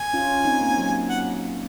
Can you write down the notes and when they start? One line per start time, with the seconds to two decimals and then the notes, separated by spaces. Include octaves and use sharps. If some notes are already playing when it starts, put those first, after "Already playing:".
Already playing: G#5
0.13 C#4 F4
0.45 C4 D#4
0.61 A#3 C#4
0.78 F#3 A#3
1.10 F#5